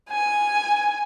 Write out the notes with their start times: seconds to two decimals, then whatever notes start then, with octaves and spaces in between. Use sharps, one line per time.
0.10 G#5